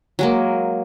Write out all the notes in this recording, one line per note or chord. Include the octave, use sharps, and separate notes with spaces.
F#3 G#3 A#3